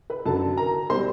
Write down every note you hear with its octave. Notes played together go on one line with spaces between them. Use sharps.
B4 B5
F#2 D3 F#3 A4 A5
A#4 A#5
B2 G3 C5 C6